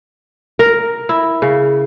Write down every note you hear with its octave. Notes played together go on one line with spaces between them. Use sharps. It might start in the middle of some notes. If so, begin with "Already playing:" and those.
A#4
E4
C#3